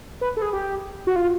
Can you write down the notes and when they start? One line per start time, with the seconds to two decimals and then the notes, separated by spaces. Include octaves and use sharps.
0.21 B4
0.37 A4
0.42 G#4
0.53 G4
1.07 F#4
1.16 F4